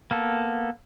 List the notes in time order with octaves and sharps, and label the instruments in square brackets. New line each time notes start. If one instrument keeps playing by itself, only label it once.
[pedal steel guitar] A#3 B3 A4